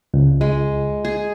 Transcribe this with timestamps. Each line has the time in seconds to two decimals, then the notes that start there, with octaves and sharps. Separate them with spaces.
0.14 C#2
0.41 G#3
1.05 G#4